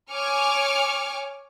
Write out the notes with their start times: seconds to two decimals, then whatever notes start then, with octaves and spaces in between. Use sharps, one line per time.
0.12 C#5 G#5 C#6 D6 F6